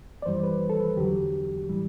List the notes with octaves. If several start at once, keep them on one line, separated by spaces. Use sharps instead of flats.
D5
F#2 E3 G3 C5
B4
A4
B4
E2 D3 F#3 G4
A2 E3 G3